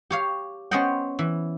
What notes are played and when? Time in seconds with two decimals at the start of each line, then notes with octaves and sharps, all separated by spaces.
0.10 G4 C#5 F5
0.71 B3 C#4 C5 D#5 F#5 G5
1.19 E3